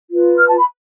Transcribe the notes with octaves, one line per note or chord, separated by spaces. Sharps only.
F4 B4
F6
A5
B5